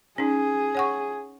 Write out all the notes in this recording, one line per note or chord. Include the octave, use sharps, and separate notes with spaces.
C#4 D#4 G#4
C#5 F#5 C#6